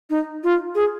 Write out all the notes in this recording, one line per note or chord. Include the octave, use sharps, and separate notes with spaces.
D#4
F4
G#4